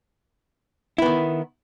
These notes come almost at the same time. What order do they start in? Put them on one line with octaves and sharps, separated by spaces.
E4 B3 D#3